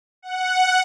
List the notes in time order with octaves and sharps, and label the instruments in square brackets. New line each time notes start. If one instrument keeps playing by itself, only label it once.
[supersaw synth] F#5